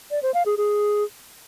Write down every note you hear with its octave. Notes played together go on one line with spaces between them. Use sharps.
D5
C5
F5
G#4
G#4